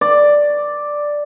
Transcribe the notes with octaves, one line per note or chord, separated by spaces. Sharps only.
D5